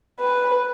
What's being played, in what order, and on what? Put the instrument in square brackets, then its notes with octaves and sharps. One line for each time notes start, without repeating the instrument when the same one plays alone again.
[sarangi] B4